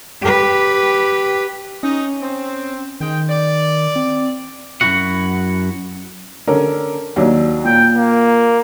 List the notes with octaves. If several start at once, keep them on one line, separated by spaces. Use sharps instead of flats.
G4 B4
C#4 D#4
C4
D#3 G#3 G5
D5
C4
F#2 D#3 E4 F#4 F#5
D3 C#4 A#4
D#2 F#3 D4
A#2 G5
A#3